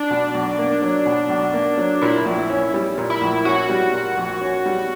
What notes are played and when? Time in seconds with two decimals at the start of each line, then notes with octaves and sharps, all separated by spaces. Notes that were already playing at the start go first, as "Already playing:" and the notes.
Already playing: D4
0.10 B2
0.34 B1
0.58 A#3
0.82 F#3
1.06 B2
1.29 B1
1.54 A#3
1.77 F#3
2.02 A#2 E4
2.25 A#1
2.50 C#4
2.74 G3
2.98 A#2
3.10 E4
3.21 A#1
3.45 C#4 F#4
3.69 G3
3.94 A#2
4.17 A#1
4.41 C#4
4.66 G3